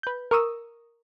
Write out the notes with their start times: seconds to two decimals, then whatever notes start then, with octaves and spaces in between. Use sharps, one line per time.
0.03 B4 G6
0.31 A#4 C#6 D#6 E6